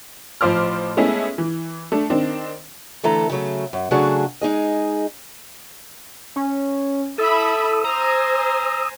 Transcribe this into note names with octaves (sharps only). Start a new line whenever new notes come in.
A1 F3 C5 D6 F6
G#3 A3 B3 C#4 E4 G#4
E3
A3 D4
D#3 C4 D4
D3 E3 A3 A4 A#5
C#3 F#3 A3
F#2
C#3 F#3 A3 D4 F#4 G#4
G#3 D#4 G#4 D#5
C#4
E4 A4 E5 B5 D#6 E6
C5 G#5 A#5